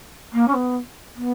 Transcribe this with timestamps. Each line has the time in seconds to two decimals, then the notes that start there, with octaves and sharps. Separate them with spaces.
0.33 A#3
0.47 C#4
0.54 B3
1.15 B3